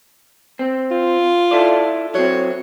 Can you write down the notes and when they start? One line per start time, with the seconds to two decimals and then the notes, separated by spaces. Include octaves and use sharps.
0.59 C4
0.91 F4
1.51 E4 A4 D5
2.15 F#3 C4 C#5